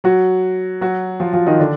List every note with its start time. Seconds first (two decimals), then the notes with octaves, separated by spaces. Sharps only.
0.04 F#3 F#4
0.81 F#3 F#4
1.20 F3 F4
1.33 F3 F4
1.46 D#3 D#4
1.59 D3 D4